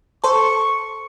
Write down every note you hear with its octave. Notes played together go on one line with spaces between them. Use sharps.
A4 C5 C#6